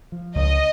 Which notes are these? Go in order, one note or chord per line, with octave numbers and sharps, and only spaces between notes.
F3
C#2 D#5